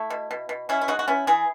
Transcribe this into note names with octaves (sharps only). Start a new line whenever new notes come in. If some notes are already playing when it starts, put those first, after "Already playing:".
Already playing: A3 E4
B2
B2
B2
B2 C#4 E4
E4
G#3 D#4 F#4
F#4
B3 C#4 E4
E3 E4 G#4